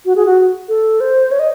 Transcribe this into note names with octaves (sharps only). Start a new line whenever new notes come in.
F#4
G#4
F#4
A4
C5
C#5
D#5